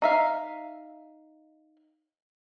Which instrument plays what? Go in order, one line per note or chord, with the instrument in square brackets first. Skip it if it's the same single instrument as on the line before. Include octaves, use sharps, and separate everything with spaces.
[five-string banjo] D#4 E5 F5